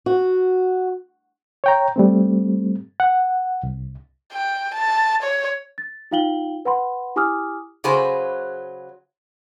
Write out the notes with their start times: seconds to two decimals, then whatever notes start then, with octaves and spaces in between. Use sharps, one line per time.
0.06 F#4
1.64 C#5 G5 A#5
1.96 G3 A3 C4
3.00 F#5
3.63 C2
4.33 G5
4.75 A5
5.23 C#5
5.78 A6
6.11 D#4 F4 F5 G5 F#7 G7
6.65 B4 F#5 B5 C6
7.16 E4 G4 G#5 D6 D#6 F6
7.84 C#3 F#3 G#4 B4 C5